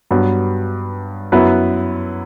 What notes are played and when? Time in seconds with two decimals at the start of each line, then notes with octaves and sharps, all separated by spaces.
0.11 G2 F#3 B3
1.32 F#2 F#3 B3 E4 B4